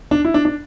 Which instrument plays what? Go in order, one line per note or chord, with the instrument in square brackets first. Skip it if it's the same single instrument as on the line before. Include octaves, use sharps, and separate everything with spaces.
[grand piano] D4
E4
D4
D4